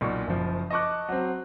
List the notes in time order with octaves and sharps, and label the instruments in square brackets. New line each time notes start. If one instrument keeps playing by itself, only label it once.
[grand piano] B1 A#2 C#6
F#1 F3
D#5 A5 C#6 D6 F#6
F#3 C4